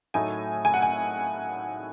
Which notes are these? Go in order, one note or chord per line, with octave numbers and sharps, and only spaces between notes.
A2 F#3 A3 D#4 G#5
G#5
F#5
G#5